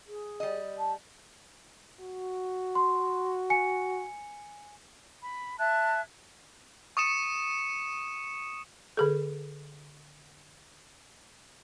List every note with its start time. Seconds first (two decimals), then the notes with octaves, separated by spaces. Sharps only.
0.06 G#4
0.40 G3 D#5
0.78 A5
2.00 F#4
2.75 C6
3.50 G#5 C#7
5.22 B5
5.59 E5 A5 F#6 G#6
6.97 C#6 D#6 C#7 E7
8.97 D3 G#4 A4